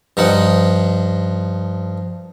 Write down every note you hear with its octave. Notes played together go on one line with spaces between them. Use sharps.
G2 F3 D#4 F#5